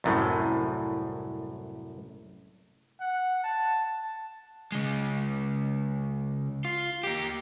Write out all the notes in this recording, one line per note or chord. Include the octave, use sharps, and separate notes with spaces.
C2 F#2 A2
F#5
A5
C#3 G#3
F4
A#3 G4